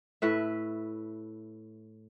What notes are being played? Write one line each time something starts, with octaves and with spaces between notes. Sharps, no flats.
A2 B4 E5